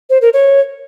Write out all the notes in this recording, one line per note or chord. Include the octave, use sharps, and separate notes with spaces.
C5
A#4
C#5